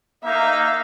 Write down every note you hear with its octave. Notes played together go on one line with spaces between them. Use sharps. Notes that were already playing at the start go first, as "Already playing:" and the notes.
A#3 D#4 E5 F5